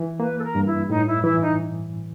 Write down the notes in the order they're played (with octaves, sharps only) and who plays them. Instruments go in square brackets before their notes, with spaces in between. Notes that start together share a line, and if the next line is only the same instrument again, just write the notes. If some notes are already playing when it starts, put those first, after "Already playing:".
Already playing: [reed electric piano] E3
[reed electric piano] A#3 [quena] B4
[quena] A4
A#4
[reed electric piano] G2
[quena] E4
[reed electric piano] A2 [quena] D#4
[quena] E4
[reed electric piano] E3 [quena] E4
[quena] D#4